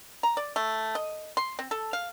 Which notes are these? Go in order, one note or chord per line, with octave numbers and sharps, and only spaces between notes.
A#5
D5
A3
D#5
C6
C4
A4
F5